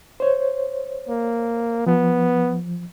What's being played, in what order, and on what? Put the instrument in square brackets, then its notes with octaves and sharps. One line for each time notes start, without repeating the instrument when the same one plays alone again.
[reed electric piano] C5 C#5
[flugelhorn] A#3
[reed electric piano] F3 [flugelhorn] B3